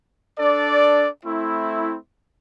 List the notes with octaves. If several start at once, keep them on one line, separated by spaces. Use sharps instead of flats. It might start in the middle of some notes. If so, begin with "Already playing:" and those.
D4 A4 D5
A3 C4 E4